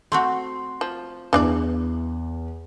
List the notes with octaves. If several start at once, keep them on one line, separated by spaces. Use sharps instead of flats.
A3 C4 F#4 C6
F3
E2 E3 D4 D5